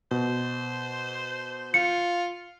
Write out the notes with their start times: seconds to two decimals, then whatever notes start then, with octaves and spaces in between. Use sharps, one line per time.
0.11 B2 C5
1.74 F4 C#7